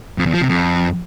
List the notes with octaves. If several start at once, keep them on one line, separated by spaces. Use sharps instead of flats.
F2
E2
F3
C3
F2